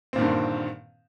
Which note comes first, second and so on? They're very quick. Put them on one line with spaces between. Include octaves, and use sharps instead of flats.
C4 A#2 D#3 G2 D3